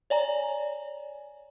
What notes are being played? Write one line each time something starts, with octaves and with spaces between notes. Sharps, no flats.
C#5 D5 G#5 A#5